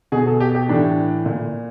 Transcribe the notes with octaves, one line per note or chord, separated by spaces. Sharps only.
B2 G#4
A4
G4
G4
A2 E3 D4
A#2